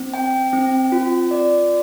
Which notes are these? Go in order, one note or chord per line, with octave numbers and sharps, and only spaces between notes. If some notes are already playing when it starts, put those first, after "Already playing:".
Already playing: C4
G5
C4
F4
D5